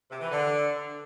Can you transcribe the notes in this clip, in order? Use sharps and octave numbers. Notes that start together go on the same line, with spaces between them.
C3
E3
D3